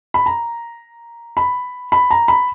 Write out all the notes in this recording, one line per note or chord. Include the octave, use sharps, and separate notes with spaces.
B5
A#5
B5
B5
A#5
B5